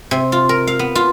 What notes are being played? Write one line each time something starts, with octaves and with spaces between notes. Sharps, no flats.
C3
F4
A#4
F5
B3
F4